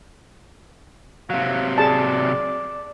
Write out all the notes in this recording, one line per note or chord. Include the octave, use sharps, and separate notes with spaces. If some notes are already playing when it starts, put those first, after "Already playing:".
C3 F#3 F5
G#4 D5 A5